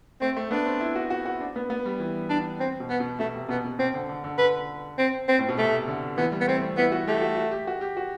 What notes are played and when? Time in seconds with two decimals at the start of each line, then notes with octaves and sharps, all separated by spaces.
0.21 A3 C4
0.36 A3
0.51 B3 D4
0.66 C4
0.81 E4
0.95 F#4
1.10 F#4
1.26 F#4
1.40 D4
1.56 B3
1.70 B3
1.85 G3
2.00 E3
2.29 D4
2.60 C4
2.80 B2
2.89 B3
3.00 B2
3.19 B2 A3
3.34 C3
3.49 B2 B3
3.64 B2
3.79 B2 C4
3.94 D3
4.09 D3
4.24 D3
4.38 D3 B4
4.98 C4
5.28 C4
5.39 A2
5.49 B2
5.58 C3 A3
5.88 D3
6.17 E3 B3
6.32 G3
6.41 B3
6.47 A3 C4
6.62 A3
6.77 B3 E4
6.92 F#4
7.07 A3 G4
7.22 F#4
7.37 F#4
7.51 G4
7.67 F#4
7.81 G4
7.97 F#4